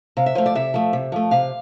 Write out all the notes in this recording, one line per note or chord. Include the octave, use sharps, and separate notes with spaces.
C3 F5
E5
F3 A3 C5
D5
C3 E5
F3 A3
C3
F3 A3
C3 F5